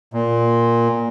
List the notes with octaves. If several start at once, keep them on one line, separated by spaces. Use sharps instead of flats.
A#2